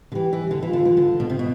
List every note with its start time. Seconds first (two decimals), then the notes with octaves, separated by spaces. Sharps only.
0.12 D3
0.15 E3 G4
0.33 E3
0.51 D3
0.62 E3
0.68 F4
0.73 D3
0.85 E3
0.97 D3
1.20 B2
1.30 C3
1.39 B2